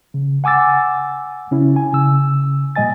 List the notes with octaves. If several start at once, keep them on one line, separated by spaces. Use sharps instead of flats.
C#3
F#5 G#5 D6 E6 A6
C#3 C#4 E4
G#5
C#3 E6
A#2 G3 D#5 G#5 A6